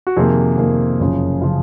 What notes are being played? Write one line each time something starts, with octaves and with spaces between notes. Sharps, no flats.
F#4
F2 C3 D#3 A#3 G#4
F2 C3 D#3 A#3
F#1 F#2 C#3 F3
C#3 F3 F4